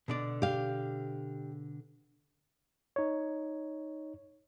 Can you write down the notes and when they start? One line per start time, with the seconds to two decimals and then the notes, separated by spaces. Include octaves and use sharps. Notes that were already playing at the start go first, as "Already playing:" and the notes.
0.08 B2 D3 D5
0.42 G4 F5
2.96 D#4 C#5